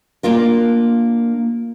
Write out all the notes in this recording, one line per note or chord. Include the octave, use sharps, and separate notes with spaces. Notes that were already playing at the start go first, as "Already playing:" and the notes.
A#3 D4 F4 A#4